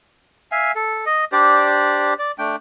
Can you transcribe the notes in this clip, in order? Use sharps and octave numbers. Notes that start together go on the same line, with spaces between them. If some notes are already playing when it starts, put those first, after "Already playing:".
E5 F5 G#5
A4
D#5
D4 G4 C5 D5
D5
A3 D4 G5